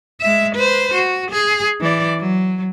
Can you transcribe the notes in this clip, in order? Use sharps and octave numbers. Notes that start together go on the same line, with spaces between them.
G#3 E5
B4 C5
F#4
G#4
E3 D5
F#3